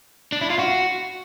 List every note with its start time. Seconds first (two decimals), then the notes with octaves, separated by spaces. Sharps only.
0.32 D4
0.41 E4
0.50 F4
0.59 F#4